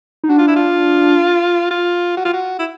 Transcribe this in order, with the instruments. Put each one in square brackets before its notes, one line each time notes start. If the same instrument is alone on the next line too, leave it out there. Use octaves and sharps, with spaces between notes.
[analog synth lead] D#4
[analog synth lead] D4 [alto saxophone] F#4
[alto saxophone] F4
E4
F4
F4
F#4
F4
F#4
E4